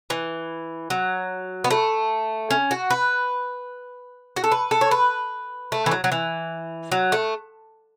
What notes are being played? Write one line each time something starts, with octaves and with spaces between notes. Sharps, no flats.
E3
F#3
B3
A3
C#4
F#4
B4
F#4
A4
B4
A4
C#5
B4
A3
E3
F#3
F#3
E3
F#3
A3